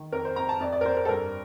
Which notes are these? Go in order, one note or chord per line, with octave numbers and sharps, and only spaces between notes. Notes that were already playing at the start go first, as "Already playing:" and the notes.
Already playing: D#3
F2 A#4
C5
F2 A#5
A5
F2 D5
D5
A#4
F2 C5
A#4
A4
G2 A#4